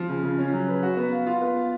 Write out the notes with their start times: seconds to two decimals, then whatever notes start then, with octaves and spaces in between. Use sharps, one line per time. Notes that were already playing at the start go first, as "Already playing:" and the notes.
Already playing: F3
0.09 C#3
0.23 C#3
0.39 C#4
0.53 F#3
0.68 B4
0.83 F#4
0.97 B3
1.12 F5
1.27 F4
1.42 B3
1.57 F5